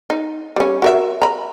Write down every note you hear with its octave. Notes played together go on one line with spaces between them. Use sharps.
D#4
G3 C#4
F#4 A#4 E5
A#5 B5